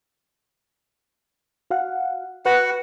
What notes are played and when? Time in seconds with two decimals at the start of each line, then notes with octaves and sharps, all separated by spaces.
1.70 F#4 F5 F#5
2.46 F#4 B4 F#5